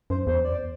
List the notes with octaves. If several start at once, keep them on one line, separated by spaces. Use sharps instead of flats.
F#2 C5
E2 C5
D5